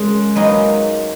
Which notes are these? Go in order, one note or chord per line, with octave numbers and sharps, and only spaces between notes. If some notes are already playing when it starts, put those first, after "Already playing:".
Already playing: C#3 F#3 G#3 A#3
F#3 A#3 D#4 G#4 B4